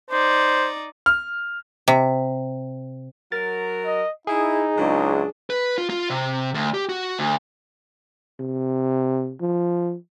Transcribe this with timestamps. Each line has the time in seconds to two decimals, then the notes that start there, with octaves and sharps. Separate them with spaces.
0.11 D#4 C5 D5
1.06 F6
1.88 C3
3.32 F#3 A#4 A6
3.86 D#5
4.27 D#4 E4 G#4
4.78 C#2 F#3 D4
5.50 B4
5.78 F4
5.90 F4
6.10 C3
6.54 D2
6.74 G4
6.89 F#4
7.19 D2
8.40 C3
9.41 F3